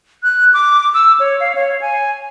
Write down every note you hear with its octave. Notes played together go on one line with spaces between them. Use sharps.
F#6
D6
E6
C#5
F5
C#5
G#5